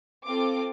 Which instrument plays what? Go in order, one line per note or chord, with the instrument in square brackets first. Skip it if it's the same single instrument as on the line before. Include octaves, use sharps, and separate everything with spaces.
[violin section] C4 F4 A4 D6